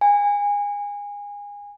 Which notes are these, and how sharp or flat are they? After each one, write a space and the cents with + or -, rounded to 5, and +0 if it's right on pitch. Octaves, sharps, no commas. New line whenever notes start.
G#5 -25